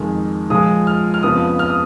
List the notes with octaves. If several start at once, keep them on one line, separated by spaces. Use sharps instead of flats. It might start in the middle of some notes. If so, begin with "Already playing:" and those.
Already playing: F2 D#3 G#3
A#2 F3 G#3 D#6
F6
F6
F2 C#3 F3 B3 D#6
F6
D#6